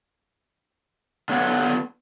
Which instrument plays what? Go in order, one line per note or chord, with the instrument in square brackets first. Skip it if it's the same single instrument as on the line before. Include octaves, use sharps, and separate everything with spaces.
[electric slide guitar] D3 B3 C#5 F#5